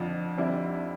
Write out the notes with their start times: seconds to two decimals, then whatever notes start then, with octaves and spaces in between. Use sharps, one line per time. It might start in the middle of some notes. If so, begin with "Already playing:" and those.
Already playing: F2 D3 F3
0.37 F2 D3 G3 C4 E4